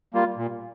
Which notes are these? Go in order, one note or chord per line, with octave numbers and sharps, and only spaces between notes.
G3 A#3 F4
A#2